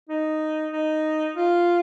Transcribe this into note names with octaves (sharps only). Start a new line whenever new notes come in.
D#4
D#4
F4